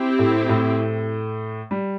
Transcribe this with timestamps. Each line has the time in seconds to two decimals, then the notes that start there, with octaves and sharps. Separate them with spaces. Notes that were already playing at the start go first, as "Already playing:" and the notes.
Already playing: C4 E4 G4
0.19 A2 A3
0.49 A2 A3
1.71 G3